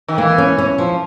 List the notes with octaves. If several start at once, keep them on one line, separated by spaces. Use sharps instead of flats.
D#3
E3 A#3
C#4
C#4
F3